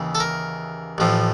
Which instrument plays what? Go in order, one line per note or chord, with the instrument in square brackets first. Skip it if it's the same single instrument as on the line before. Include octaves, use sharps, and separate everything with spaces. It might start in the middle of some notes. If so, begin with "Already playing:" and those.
Already playing: [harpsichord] D#2 C#3 E3
A4
A#4
A1 A2 F3